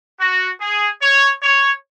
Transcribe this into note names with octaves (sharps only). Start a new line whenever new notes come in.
F#4
G#4
C#5
C#5